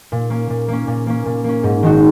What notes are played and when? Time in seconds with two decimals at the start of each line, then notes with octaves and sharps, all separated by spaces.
0.12 A#2
0.30 A#3 C#4
0.50 A#2
0.68 A#3 C#4
0.87 A#2
1.07 A#3 C#4
1.26 A#2
1.44 A#3 C#4
1.63 G#2
1.83 D#3 G#3 D#4 F#4